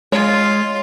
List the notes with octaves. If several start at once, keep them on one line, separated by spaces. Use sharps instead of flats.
G#3 F4 C#5